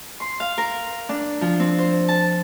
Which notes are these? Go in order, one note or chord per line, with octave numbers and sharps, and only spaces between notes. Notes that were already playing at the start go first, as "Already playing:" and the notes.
C6
F5
A#4
D4
F3
C4
C5
A5